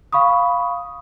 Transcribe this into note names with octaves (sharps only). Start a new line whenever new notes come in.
F5 B5 C#6 D#6